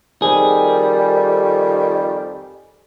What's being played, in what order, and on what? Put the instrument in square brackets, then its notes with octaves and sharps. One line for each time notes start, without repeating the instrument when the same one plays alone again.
[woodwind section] F2 D#3 [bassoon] G3 [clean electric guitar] G#4